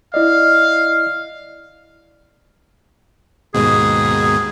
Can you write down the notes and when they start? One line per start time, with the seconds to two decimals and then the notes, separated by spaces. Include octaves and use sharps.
0.14 E4 D5 D#5 F5
3.54 D#2 G#2 B2 G#4